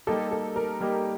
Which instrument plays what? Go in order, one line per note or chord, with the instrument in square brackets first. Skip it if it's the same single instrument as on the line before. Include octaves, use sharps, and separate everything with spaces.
[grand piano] G3 A#3 D#4 G4 [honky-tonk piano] A4
[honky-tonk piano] A4
A#4
[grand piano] G3 A#3 D#4 G4